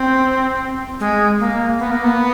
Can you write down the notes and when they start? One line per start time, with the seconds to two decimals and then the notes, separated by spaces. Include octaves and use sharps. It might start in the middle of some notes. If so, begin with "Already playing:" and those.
Already playing: C4
1.00 G#3
1.40 A#3
1.79 B3
1.91 A#3
2.04 B3